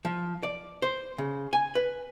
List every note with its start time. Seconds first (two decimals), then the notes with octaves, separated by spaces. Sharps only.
0.05 F3
0.43 D5
0.82 C5
1.18 C#3
1.53 G#5
1.75 B4